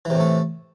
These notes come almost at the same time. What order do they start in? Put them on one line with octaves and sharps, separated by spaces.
E3 C3 A2 A3